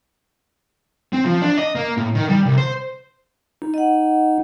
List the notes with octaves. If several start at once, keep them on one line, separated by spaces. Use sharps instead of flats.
C4
F3
D4
D#5
A#3
A2
D#3
G3
C2
C5
D#4
D#5 F#5